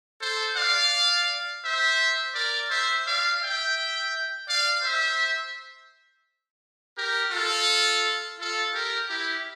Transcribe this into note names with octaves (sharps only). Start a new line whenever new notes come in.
A4 C5
D5 F5
C5 E5
A#4 D5
C5 E5
D5 F5
E5 G5
D5 F5
C5 E5
G4 A#4
F4 A4
F4 A4
G4 A#4
E4 G4